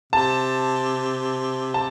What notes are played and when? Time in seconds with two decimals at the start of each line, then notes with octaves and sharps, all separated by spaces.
0.13 C3 A5
1.74 A5